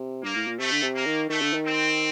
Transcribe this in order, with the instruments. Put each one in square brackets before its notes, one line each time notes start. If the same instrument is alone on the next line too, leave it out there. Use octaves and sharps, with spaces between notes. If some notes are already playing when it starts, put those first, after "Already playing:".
Already playing: [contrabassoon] C3
[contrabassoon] G2 [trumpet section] A#3
[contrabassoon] A2
A#2
[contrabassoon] C3 [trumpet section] A3
[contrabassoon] D3
C3
[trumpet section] A#3
[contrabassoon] D#3
[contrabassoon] D#3 [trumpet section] A3
[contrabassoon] D3
D#3
[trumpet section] C4